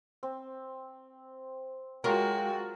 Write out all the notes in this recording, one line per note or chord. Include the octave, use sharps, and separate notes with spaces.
C4
F#3 G#3 F4 F#4 A#4 G5 A5